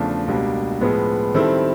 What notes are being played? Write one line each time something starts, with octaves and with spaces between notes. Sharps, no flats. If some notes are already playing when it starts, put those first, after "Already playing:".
Already playing: E2 C#3 F3 A3 D4
C#2 B2 G3 A#3 D4
A2 F3 G#3 B3
D#3 G3 C4 E4 A4